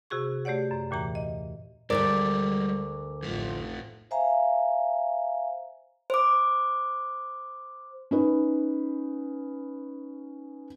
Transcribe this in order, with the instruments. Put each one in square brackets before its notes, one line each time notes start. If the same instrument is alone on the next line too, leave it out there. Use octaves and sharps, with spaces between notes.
[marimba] C3 F#4 G#4 C#6
A3 G4 C#5 D5 F#5
F#2
D#2 A#2 E3 A#5
D#5
[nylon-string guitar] D2 B2 D5 [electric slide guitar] G3 G#3 [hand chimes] A#4 D6
[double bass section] A1 A2 F3 [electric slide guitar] F2 A3
[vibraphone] C5 E5 F5 G#5 A#5
[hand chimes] C5 D6
[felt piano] C#4 D#4 B4